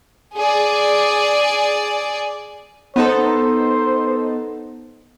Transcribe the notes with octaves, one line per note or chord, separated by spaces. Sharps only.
G#4 D5
B3 D#4 A4 C5